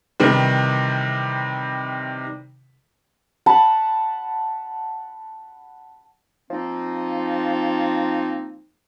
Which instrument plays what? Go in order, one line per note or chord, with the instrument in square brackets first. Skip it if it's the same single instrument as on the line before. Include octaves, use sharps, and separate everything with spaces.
[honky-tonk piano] C3 D#3 E3 G3
[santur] F#5 A5 B5
[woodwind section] F3 A#3 C4 D#4